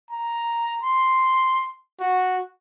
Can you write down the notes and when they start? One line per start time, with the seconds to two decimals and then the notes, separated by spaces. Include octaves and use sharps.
0.11 A#5
0.83 C6
2.00 F#4